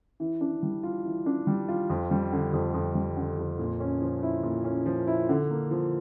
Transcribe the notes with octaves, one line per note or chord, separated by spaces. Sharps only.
E3
D4
G3
F4
E3
D4
G3
F4
F2
G3
D3
F2
F2
G3
D3
F2
A#2
C#4
F3
E4
A#2
C#4
F3
E4
D3
A#3
F3